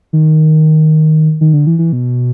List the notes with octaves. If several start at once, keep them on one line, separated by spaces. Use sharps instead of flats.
D#3
D#3
D3
E3
E3
B2